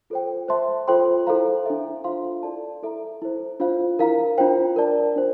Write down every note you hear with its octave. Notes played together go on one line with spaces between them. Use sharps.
F4 A4 C5 G5
C5 E5 A5 C6
F4 A4 C5 G5 C6
E4 A4 C5 F5 A#5
D4 A4 E5
F4 C5 F5 C6
E4 A4 D5 A5
E4 A4 E5 A#5
E4 A4 C5
D4 F4 C5 F5
E4 A#4 F5 A#5
D4 F4 C5 G5
A#4 D5 A5
D4 F4 C5